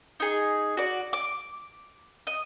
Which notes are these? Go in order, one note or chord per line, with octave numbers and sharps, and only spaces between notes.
D#4 G#4
F#4 D5
D6
D#5